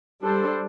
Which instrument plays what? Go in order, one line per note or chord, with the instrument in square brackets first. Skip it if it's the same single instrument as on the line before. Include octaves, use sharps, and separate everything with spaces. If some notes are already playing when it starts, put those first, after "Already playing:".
[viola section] G3 D4 A4 C5